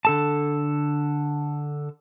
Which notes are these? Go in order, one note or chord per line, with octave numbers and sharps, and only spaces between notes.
D3 A4 A5